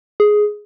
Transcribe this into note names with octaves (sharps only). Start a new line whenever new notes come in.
G#4